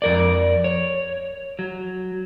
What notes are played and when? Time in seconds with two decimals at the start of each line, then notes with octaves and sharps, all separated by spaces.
0.02 F2 A#4 D5
0.64 C#5
1.59 F#3